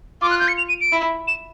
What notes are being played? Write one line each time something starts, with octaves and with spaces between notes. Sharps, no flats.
F4 D6
F#6
G6
C#7
F7
D#7
D7
E4
E7